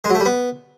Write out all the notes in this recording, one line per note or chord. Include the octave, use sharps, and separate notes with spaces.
G#3
F#3
A3
G3
B3